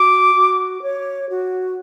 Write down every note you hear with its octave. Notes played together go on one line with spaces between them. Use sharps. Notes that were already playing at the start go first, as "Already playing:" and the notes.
Already playing: F#4 D6
F#4
C#5
F#4